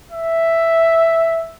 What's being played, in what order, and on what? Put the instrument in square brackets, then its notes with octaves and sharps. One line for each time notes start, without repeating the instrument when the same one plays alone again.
[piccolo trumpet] E5